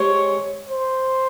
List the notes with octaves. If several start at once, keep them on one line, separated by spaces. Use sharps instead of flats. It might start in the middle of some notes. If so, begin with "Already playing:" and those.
Already playing: G#3 C4 G4 C#5
C5